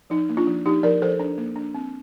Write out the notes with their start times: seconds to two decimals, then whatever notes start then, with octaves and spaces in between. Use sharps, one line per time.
0.10 F3 D#4
0.29 A#3
0.37 D4 F4
0.47 F3
0.66 F3 D#4 G4
0.83 F3 A#4 D5
1.02 F3 A4 C5
1.20 D4
1.38 A#3
1.56 D4
1.75 C4